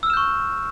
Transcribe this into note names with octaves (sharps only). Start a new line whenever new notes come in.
C#6 E6 F6 G6 E7